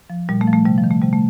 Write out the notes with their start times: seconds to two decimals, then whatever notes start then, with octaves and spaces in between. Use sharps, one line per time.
0.10 F3
0.29 A#2 G3
0.41 A3
0.47 F3
0.53 A3
0.65 C3 G3
0.78 F3
0.84 D#3
0.91 A3
1.02 C3 G3
1.13 A3